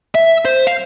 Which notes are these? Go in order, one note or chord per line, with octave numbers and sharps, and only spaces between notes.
E5
C5
F5